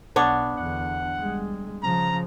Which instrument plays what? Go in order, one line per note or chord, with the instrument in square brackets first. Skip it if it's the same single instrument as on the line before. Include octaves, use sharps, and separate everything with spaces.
[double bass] B1 [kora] B3 D4 C#5
[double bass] E2 D3 [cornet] F#5
[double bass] G3 G#3
[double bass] C#3 F3 [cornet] A#5